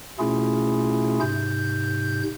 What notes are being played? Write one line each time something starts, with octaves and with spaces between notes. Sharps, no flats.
B2 A3 C#4 E4 F4 G#4
G#2 C3 G6